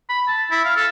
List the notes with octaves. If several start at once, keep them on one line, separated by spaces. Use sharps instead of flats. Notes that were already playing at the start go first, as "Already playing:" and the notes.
B5
A5
E4
F5
A4